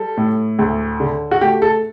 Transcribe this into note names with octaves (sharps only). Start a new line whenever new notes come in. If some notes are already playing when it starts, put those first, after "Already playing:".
Already playing: G3 A4
A2
D2
D3
F#4
A3 G4
A4